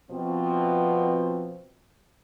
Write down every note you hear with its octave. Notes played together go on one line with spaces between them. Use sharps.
B2 F3 C4